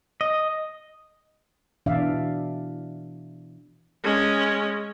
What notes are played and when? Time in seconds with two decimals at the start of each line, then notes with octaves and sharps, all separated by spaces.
0.21 D#5
1.86 B2 E3 D4 D5 E5 F5
4.04 G#3 C#4